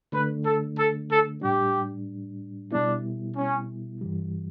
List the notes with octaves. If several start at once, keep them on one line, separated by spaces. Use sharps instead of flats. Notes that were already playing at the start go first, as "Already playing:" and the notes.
D3 A3 D4 B4
A4
A4
A4
A2 G3 D4 G4
B2 G3 B3 D4 E4
C#4
G2 E3 G3